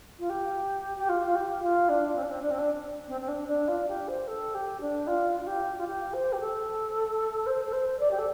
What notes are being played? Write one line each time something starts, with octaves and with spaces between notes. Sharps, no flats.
F4
G4
G4
F4
F4
G4
F4
D4
C4
D4
C4
D4
C4
D4
C4
C4
D4
D4
F4
G4
C5
A4
G4
D4
F4
F4
G4
F4
G4
C5
G4
A4
C5
A4
C5
D5
G4
A4